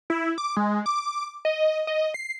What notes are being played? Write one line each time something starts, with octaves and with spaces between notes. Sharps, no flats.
E4
D6
G#3
D6
D#5
D#5
C7